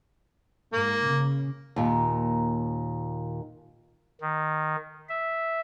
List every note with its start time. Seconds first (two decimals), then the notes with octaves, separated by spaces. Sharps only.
0.73 G#2 A#3
1.07 C#3
1.76 D#2 A#2
4.21 D#3
5.09 E5